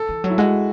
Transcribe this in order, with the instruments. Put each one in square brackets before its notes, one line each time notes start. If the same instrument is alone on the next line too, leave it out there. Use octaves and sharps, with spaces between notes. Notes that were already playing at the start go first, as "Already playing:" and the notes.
Already playing: [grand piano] A4
[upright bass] E3
F#3
[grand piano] E4
[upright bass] G#3 [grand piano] F#4